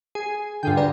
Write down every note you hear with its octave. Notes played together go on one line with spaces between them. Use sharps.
G#4
G2 D3 F4 G#4 G5
B4 D5 A#5